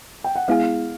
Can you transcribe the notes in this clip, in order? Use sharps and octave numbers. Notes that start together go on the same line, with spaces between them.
G5
F#5
G#3 B3 E4 G#4 F5